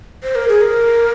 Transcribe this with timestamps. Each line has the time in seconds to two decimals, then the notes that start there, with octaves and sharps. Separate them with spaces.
0.23 C5
0.35 A#4
0.48 G#4
0.61 A#4